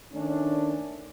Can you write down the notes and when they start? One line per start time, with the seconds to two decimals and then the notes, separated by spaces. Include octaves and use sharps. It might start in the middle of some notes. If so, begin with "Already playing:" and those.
0.13 D#3 A3 C#4 D4